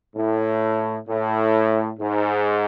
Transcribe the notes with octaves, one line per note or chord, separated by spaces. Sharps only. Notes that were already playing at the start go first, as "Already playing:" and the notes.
A2
A2
G#2